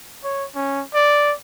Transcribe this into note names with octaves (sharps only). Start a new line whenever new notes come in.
C#5
C#4
D5